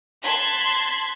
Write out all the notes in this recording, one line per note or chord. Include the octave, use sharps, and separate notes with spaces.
A5 C6 F#6 G#6 B6